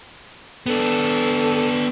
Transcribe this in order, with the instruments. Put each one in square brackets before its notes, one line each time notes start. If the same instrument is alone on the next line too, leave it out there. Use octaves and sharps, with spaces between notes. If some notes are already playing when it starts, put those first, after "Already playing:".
[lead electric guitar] B3 D4 [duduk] A4